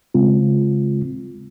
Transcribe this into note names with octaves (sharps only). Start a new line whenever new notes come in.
C#3 G#3 C4 F4